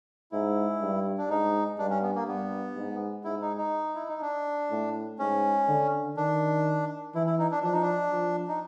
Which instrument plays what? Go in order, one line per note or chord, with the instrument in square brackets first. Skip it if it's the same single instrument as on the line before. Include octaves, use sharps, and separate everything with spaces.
[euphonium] G#2 [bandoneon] E4
[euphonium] G2
[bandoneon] D4
[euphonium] G#2 [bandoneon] D#4
[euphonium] G2 [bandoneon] D4
[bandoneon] C#4
B3
A#3
[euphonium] G2 [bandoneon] B3
[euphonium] G#2
[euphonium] G#2 [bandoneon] E4
[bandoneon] D#4
D#4
E4
D#4
D4
[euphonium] A2
[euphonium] G#2 [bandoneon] C#4
[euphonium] D3
[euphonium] D#3 [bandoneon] D4
[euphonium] E3 [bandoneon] E4
[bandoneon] E4
D#4
D4
[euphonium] F3 [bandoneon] D4
[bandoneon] D#4
D4
[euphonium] F3
[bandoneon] D#4